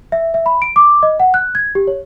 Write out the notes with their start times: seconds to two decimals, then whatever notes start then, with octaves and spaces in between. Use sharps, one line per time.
0.12 E5
0.34 E5
0.46 B5
0.62 D7
0.76 D6
1.03 D#5
1.20 F#5
1.34 F#6
1.55 G#6
1.75 G4
1.87 C#5